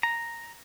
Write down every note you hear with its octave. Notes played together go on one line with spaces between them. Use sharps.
A#5